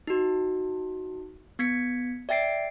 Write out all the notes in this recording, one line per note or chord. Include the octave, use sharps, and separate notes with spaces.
D#4 F#4
B3 G#6 B6 C#7
D5 E5 G5 A6 C7 D7